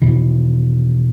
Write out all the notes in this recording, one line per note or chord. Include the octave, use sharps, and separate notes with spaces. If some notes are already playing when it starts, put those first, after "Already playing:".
E2 B2 D#3 E3